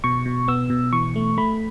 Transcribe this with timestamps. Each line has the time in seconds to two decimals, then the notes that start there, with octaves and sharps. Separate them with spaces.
0.04 B2 C#6
0.26 B2
0.48 B3 E6
0.70 B2
0.93 E3 C#6
1.16 A3
1.38 A3 B5